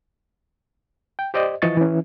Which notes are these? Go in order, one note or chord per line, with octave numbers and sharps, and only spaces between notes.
G5
G4 C5 D5 D#5
E3 F3 D#5 C#6 A6
E3 C#4